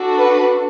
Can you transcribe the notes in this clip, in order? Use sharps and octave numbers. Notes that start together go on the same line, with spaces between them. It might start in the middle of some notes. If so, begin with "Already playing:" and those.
Already playing: D4 F#4 A4
B4